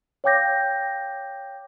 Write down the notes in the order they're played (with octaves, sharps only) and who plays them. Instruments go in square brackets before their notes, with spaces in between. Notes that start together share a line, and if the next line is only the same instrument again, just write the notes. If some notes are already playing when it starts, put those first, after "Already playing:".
[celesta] C#5 F5 G5 D6 G6 A#6